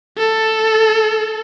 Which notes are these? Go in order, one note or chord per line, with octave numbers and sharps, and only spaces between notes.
A4